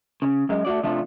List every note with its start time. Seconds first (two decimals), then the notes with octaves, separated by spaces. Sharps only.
0.22 C#3
0.49 F#2 G#3
0.65 A3 F#4 D5
0.83 C3 F3 A3 D4 F4